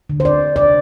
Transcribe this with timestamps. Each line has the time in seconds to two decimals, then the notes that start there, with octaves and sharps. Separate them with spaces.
0.09 D3
0.20 C5
0.25 D5
0.56 C3 D5